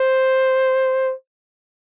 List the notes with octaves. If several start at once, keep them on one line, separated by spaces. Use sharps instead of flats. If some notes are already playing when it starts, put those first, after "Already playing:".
Already playing: C5